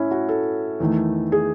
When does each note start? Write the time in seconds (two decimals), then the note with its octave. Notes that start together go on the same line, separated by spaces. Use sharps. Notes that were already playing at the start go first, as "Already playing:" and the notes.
Already playing: A2 C#4 E4
0.11 F#4
0.29 A4
0.80 E2 D#3 A3
1.32 G#4